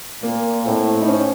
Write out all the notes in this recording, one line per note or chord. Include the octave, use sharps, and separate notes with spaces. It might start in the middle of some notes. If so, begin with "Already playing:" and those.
A#2 A#3
A2 C4
D#4
C#4